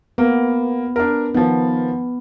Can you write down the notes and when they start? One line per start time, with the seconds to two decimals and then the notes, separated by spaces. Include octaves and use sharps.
0.18 A#3 B3
0.96 D4 A#4
1.34 D#3 F3 B3